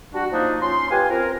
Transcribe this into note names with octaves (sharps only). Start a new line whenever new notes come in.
G3 D4 F#4
F3 A#3 D4 D#4
C#4 F4 C6
G4 B4 F5 G#5
C4 F4 A#4